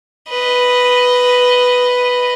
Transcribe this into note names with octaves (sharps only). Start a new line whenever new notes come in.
B4 D#5